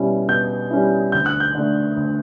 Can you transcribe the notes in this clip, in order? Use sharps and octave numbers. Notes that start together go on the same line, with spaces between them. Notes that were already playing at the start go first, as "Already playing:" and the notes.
Already playing: B2 G3 C#4 E4
B2 G6
G3 C#4 E4
D2 G6
F#6
G6
D3 A3
D2